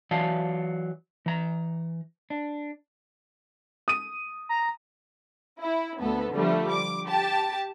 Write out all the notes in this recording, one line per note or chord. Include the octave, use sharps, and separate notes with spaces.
E3 F#3 D5 F5 A5
E3 A#5
D4
D#6 D#7
A#5
E4
D2 B3 A4
D3 F3 G3 A3
D6
G4 A5